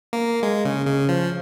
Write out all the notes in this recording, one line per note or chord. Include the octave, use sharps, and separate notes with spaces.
A#3
G#3
C#3
C#3
F3